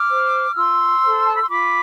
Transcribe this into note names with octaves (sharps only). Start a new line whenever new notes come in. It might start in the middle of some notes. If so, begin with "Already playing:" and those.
Already playing: D6 F6
C5
F4 C6 E6
A4 C5
A5
B5
C6
F4 B5 D6